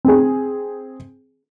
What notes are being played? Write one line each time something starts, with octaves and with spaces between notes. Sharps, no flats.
C4 G#4